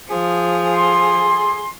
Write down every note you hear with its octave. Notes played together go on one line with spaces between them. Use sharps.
F3 G#4
A4 G#5 C6